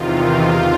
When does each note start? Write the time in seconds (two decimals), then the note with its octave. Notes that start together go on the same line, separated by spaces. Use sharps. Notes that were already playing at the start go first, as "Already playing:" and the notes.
Already playing: E2 C3 D#3 F4
0.12 F4
0.46 C#3